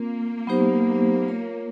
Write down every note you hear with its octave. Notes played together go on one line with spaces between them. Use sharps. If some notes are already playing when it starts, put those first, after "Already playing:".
Already playing: A#3 C4 F4 A#4
F#3 B3 D#4 G4 C5
F4 A#4 C#5